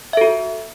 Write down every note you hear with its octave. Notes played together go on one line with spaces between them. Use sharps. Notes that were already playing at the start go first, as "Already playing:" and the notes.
F#4 A4 E5